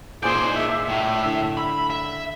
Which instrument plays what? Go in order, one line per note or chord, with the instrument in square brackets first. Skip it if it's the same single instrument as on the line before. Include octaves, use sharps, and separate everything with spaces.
[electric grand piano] A#2 G#5 G6 [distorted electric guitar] D#4 D5 [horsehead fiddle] G#4 C5
[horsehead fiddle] E5
[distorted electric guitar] A2
[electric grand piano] D3 E4
[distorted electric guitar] B5
E5